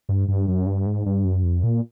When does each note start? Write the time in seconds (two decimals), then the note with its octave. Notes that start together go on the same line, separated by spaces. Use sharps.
0.09 G2
0.28 G2
0.48 F#2
0.66 G2
0.86 G#2
1.06 G2
1.25 F#2
1.43 F2
1.63 A#2